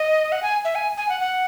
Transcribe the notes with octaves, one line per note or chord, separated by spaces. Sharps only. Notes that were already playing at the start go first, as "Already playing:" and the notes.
Already playing: D#5
F#5
G#5
E5
G#5
G#5
F#5
F#5